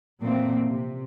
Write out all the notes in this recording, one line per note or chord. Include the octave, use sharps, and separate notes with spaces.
A#2 E3 F3 A3 A#3 C4
C3